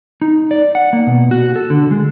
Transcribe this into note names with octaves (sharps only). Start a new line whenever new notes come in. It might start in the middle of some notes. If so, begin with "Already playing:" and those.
D#4
D5
F#5
A#3
B2
F#4
A4
D3
G#3